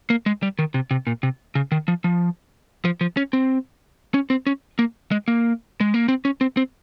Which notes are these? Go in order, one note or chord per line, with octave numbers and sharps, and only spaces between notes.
A#3
G#3
G3
D#3
C3
C3
A#2
C3
C#3
D#3
F3
F3
F3
F3
C#4
C4
C#4
C4
C#4
A#3
G#3
A#3
G#3
A#3
C4
C#4
C4
C4